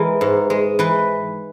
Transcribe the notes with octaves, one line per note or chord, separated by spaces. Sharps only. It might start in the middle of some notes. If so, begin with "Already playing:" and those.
Already playing: E3 G#3 A#4
G#2
G#3
E3 B4